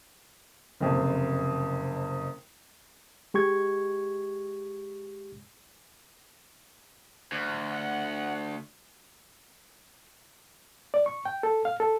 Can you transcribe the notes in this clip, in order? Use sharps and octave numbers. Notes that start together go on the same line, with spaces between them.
F#1 F2 C3
G#3 G4 C#6 G#6
D2
F#5
D5
C#6
G5
A4
F5
A4